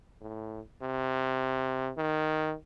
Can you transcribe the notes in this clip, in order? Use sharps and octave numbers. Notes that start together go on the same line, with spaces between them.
A2
C3
D#3